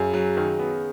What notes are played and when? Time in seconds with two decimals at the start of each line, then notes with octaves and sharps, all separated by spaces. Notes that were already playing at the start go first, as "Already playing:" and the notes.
Already playing: F#2 C#3
0.14 F#3
0.37 D#3
0.59 B3